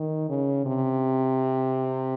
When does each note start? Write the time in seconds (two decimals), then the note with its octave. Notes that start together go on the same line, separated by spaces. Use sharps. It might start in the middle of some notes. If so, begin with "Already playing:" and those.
Already playing: D#3
0.29 C#3
0.66 C3